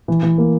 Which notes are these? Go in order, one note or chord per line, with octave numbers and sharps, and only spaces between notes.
E3
E3
A#3